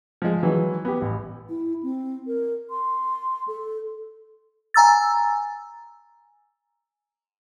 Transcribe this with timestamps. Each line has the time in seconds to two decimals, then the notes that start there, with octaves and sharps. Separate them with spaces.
0.22 F3 G#3
0.43 E3 F#3
0.85 B3 G4
1.01 A1
1.49 E4
1.83 C4
2.27 A#4
2.70 C6
3.48 A4
4.74 G#5 A#5 E6 A6